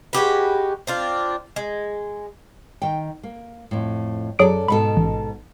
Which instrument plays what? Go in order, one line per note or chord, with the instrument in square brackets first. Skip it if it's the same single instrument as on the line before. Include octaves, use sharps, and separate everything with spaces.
[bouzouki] G#3 F#4 G4 B4
C4 D4 F4
G#3
[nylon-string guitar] D#3 G5
A#3
F2 A2
[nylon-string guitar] F#2 A4 D5 [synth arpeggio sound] F#3 G#4 D7
[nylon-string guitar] G#2 B2 A4 [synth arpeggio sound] B5
[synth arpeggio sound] A1